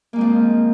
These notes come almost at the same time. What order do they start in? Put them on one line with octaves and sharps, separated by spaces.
A#3 G#3 C4 F3